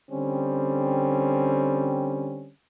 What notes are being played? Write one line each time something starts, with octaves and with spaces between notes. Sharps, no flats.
D3 G3 C4 C#4